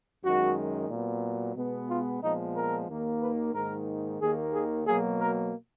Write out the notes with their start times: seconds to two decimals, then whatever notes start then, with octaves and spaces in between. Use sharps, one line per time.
0.23 F#2 D#3 G#3 F#4
0.90 A#2 F#3 B3
1.56 B2 G#3 B3
1.89 F4
2.22 A#2 F3 G#3 B3 D#4
2.55 A#4
2.88 D#2 D#3 A#3
3.22 B4
3.54 G#2 D#3 A#3 A#4
4.21 D#2 D#3 A#3 G#4
4.53 G#4
4.87 B2 F#3 A#3 G#4
5.20 A#4